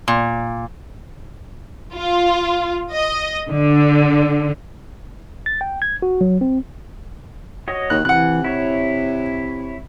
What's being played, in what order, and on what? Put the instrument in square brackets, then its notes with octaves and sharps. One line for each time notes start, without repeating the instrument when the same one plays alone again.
[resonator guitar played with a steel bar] A#2
[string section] F4
D#5
D3
[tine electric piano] A6
G5
G#6
F#4
F#3
C4
[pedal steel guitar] F#4 C#5 D#5
[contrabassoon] D#2 [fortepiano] F#6
[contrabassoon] C3 [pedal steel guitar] E3 [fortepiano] F#5 F#6
[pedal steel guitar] E4 C#5